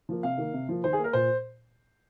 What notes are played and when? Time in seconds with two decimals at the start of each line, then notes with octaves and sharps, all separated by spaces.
0.09 F3 A#3
0.23 C3 F5
0.38 D#3 A#3
0.54 C3
0.69 F3 A#3
0.84 D#3 C5
0.93 G#4
0.98 A#3
1.04 A#4
1.13 A#2 C5